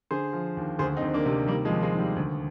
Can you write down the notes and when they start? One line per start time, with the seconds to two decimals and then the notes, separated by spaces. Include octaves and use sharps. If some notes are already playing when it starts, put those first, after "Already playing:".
0.11 D3 G#4 C5
0.33 F3
0.57 D#2
0.79 D2 G#4 C5
0.97 C4 D#4
1.02 D2
1.14 A#3 D4
1.26 C3
1.47 D#3 G3 A#3
1.65 F3 G#3
1.70 D#2
1.82 F3 G#3
1.93 D#2
1.99 G3
2.16 D2